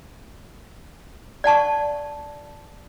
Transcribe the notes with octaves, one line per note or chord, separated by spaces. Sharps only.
D5 F#5 A5 C#6